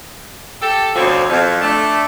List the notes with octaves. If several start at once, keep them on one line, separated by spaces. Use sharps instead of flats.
G4 A4
D2 B2 F3 C4 C#5 D5
F2
A3 D4